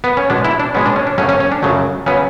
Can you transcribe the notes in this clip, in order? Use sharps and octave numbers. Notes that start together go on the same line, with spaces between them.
B3
C#4
B2 G#3 B3 D4
E4
D4
B2 G#3 B3 C#4
D4
C#4
D4
F#2 C#3 F#3 A3 C#4
C#4
C#4
D4
F#2 C#3 F#3 A3
C#3 F#3 B3 C#4